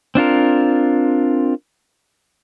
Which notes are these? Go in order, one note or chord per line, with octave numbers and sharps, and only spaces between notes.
C4 D4 F4 A#4